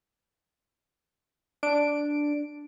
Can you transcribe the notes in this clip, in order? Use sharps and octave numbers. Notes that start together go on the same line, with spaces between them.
D4 D7